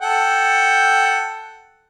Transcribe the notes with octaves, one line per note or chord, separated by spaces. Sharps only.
A4 F#5 G5